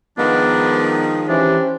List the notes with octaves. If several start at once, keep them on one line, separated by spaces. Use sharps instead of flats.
D#3 F3 G#3 B3 D4
E3 C#4 D4 G4 C5